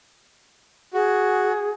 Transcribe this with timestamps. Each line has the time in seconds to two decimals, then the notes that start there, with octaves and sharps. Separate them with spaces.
0.94 F#4 G#4